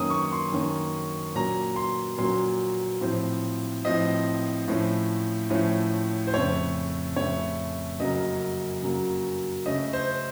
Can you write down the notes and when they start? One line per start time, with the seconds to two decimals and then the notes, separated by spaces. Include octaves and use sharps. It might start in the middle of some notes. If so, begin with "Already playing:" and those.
Already playing: F#2 D#3 A#3 C#4 D#6
0.10 C#6
0.32 C6
0.52 F#2 D#3 A#3 C#4
1.35 A#2 F#3 A#3 C#4 A#5
1.76 C6
2.18 A#2 F#3 A#3 C#4 C6
3.01 A2 F3 C4
3.85 A2 F3 C4 D#5
4.68 A2 F3 A3 C#4
5.50 A2 F3 A3 C#4
6.27 C5
6.33 F2 C#3 A3 C#5
7.16 F2 C#3 A3 C#5
8.00 F#2 C#3 F#3 A#3 D#5
8.82 F#2 C#3 F#3 A#3
9.66 C#3 A3 C#4 D#5
9.93 C5